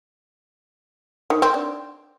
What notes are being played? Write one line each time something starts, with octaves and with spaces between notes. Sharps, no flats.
D#3
C4
D4